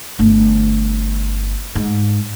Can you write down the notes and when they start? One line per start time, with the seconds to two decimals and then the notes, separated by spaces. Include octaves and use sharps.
0.19 G1 A3
1.75 G#2